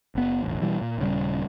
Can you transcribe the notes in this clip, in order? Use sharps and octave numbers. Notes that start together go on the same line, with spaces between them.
F#1 B3
E1 A1
B2 E3 G3
A#2
D#1 C#3 G3